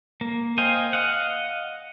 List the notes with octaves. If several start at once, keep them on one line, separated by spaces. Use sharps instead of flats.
A#3
C5 D#5 F5 G5 G#5
D#5 F5 F#5